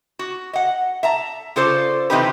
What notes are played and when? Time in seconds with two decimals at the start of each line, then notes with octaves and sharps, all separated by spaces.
0.19 F#4
0.53 D#5 F#5
1.03 E5 A5 A#5
1.56 C#3 F4 A4 C5 D5
2.10 C3 E3 C4 D#4 G4 B4